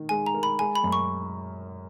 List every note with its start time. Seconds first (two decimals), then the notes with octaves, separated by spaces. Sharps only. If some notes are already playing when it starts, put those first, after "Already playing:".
Already playing: D#3 D#4
0.09 G#3 G#5
0.26 A#5
0.34 A#4
0.43 B5
0.59 G#3 G#5
0.75 B5
0.84 F#2
0.92 C#6